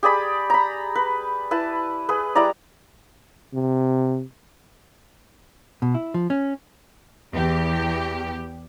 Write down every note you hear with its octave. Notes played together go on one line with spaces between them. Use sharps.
G4 G#4 D5 B5
A#5 B5
B4
E4 B4 A5
G#4 B4
G3 E4 D5 A#5
C3
B2
E4
F3
C#4
E2 G4